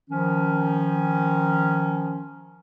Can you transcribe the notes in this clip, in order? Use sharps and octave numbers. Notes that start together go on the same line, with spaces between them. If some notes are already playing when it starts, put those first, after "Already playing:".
D#3 F3 C#4